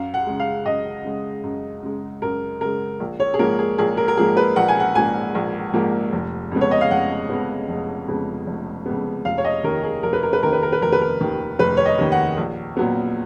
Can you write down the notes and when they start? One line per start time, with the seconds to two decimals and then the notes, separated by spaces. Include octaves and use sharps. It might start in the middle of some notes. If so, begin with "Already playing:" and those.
Already playing: F#2 F5
0.14 F#5
0.27 C#3 G#3
0.40 F5
0.66 F#2 D#5
1.05 C#3 G#3
1.43 F#2
1.83 C#3 G#3
2.22 F#2 A#4
2.61 C#3 G#3 A#4
3.00 A#1
3.20 C#5
3.34 G#4
3.39 G#2 F3 A#3 A#4
3.59 G#4
3.78 A#1 G#4
3.97 A#4
4.08 A#4
4.17 G#2 F3 A#3 G#4
4.37 B4
4.56 A#1 F#5
4.68 G#5
4.80 F#5
4.95 G#2 F3 A#3 G#5
5.35 A#1
5.73 G#2 F3 A#3
6.13 F1
6.51 F2 C#3 G#3 B3
6.61 C#5
6.71 D#5
6.81 F5
6.91 F1 F#5
7.30 F2 C#3 G#3 B3
7.69 F1
8.08 F2 C#3 G#3 B3
8.47 F1
8.86 F2 C#3 G#3 B3
9.25 F1 F5
9.38 C#5
9.45 D#5
9.64 D#2 D#3 A#4
9.84 G#4
10.03 F1 A#4
10.13 B4
10.23 A#4
10.33 B4
10.42 D#2 D#3 A#4
10.53 B4
10.63 A#4
10.72 B4
10.82 F1 A#4
10.92 B4
11.02 A#4
11.21 D#2 D#3
11.59 F1 B4
11.77 C#5
11.86 D#5
11.98 D#2 D#3
12.12 F#5
12.37 A#1
12.77 A#2 F#3 B3